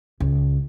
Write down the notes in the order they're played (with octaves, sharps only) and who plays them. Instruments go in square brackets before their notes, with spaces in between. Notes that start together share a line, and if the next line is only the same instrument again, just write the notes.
[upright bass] C#2